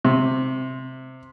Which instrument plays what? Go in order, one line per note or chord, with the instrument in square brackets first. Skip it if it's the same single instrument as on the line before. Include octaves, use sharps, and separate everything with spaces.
[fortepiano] C3